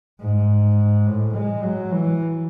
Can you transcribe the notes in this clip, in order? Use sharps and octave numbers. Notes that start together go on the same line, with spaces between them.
G#2
A2
G#3
F#3
E3